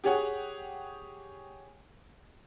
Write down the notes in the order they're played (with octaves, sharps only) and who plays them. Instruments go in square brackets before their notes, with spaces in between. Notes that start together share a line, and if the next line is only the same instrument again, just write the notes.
[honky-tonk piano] G4 G#4 C#5 F#5